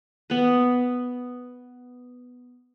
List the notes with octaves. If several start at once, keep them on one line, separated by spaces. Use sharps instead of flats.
B3 B4